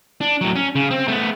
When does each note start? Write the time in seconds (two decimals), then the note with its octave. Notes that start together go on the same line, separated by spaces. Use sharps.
0.21 D4
0.41 A2 F#3
0.55 C#4
0.75 C#3
0.91 C4
1.08 A3 B3